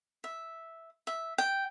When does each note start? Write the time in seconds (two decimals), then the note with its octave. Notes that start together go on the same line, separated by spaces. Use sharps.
0.24 E5
1.07 E5
1.38 G5